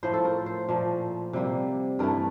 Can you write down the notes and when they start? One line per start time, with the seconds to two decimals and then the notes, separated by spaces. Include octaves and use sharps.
0.03 A2 F3 A3 C5
0.13 A4
0.25 A#4
0.46 C5
0.69 A#2 F3 A3
1.33 C3 G3 A#3
1.99 G2 E3 A3 A#4